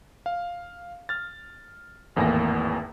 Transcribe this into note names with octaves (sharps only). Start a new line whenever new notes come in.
F5
F6 A6
G#1 E2 A2 A#3 G#5 A#6